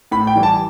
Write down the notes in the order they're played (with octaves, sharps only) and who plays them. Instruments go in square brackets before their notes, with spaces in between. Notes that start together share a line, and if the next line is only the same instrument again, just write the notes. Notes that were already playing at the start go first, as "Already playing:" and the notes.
[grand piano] A2 B5
G5
E3 G3
A5